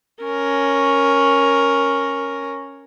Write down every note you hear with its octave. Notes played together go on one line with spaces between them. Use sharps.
C#4 A#4